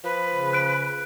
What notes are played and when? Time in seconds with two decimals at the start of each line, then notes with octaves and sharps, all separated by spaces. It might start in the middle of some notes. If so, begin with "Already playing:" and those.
0.04 F3 B4
0.34 C#3
0.53 F#6 D7